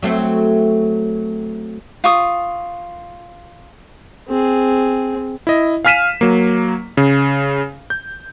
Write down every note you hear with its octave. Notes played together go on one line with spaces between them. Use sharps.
F#3 A3 C4
F4 C#6 D#6
C4 G#4
E4 D#5
F5 G#5 F6 B6 D#7 E7
F#3 A#3
C#3
G6